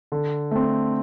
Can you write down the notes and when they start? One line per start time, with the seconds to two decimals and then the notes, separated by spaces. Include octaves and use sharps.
0.12 D3
0.51 A3 C4